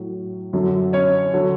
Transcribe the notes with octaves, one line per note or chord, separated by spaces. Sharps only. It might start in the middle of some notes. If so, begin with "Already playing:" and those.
Already playing: A2 F#3
F#2 D3 F#3
C#4 C#5
D3 F#3